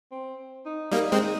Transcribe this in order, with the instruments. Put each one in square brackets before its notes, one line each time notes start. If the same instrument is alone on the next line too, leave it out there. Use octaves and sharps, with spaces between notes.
[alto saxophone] C4
D#4
[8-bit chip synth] G3 A#3 [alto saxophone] D#4
[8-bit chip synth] G#3 C4